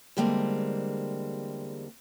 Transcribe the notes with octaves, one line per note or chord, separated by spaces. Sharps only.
E2 D3 G3 G#3 A#3 C4